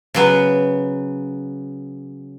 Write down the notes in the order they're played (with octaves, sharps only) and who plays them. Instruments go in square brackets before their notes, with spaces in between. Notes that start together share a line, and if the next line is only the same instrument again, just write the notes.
[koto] C#3 F#3 B3